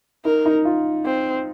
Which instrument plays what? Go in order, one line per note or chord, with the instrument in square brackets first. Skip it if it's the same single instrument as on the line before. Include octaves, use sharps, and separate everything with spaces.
[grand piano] D#4 [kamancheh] A#4
[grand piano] D#4
F4
[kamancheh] C4